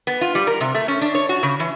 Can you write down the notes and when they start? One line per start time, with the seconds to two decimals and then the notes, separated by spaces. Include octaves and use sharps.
0.07 B3
0.21 F4
0.35 G3
0.47 A#4
0.61 C3
0.75 A3
0.88 C#4
1.02 D4
1.15 C#5
1.29 F#4
1.43 C#3
1.60 E3